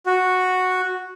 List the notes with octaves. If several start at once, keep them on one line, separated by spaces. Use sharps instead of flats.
F#4